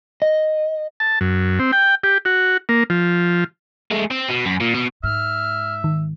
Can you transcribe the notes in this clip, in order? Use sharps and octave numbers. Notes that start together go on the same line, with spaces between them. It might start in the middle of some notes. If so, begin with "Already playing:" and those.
D#5
A5
F#2
C4
G5
G4
F#4
A#3
F3
G#3 A3
C4
B2
F#2
A#2
B2
G#2 E5 F6
D#3